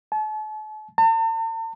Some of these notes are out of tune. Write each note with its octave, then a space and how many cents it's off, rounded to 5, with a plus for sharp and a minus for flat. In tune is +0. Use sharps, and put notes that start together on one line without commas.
A5 -40
A5 +45